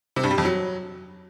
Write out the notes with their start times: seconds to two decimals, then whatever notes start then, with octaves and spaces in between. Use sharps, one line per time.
0.16 C3
0.23 G2
0.31 G3
0.38 F2
0.45 F#3